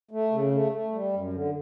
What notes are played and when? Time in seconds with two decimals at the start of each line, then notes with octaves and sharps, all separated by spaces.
0.11 A3
0.31 C#3
0.52 A3
0.72 A3
0.92 G3
1.13 F#2
1.33 D3